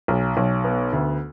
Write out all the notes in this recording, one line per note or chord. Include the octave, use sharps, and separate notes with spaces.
B1
B1
B3
D2